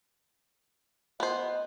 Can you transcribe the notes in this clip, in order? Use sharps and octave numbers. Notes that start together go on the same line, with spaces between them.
B3 C5 D#5